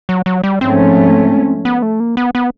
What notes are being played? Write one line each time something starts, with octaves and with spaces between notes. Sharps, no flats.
F#3
F#3
G3
G#2 F3 A3 C4 C#4
B3
A3
A#3
B3
B3